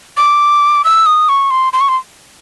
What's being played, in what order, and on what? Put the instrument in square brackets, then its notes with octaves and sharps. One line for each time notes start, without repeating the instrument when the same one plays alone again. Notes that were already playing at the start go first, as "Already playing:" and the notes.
[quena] D6
E6
D#6
C#6
C6
C6
C#6
C6